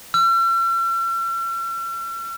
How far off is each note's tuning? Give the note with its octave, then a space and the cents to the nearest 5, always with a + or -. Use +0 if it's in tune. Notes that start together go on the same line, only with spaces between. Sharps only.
E6 +45